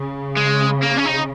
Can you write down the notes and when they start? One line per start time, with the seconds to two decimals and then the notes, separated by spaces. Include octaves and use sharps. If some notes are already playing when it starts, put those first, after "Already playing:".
Already playing: C#3
0.37 G#3
0.82 A#3
0.97 C#4
1.05 D#4